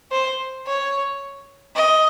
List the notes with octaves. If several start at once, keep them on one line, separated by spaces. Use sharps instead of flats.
C5
C#5
D#5